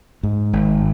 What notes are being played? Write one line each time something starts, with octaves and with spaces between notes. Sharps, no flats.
G#2
G#1